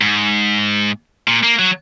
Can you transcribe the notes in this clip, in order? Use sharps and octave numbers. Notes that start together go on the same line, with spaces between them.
G#2
A#2
A#3
F#3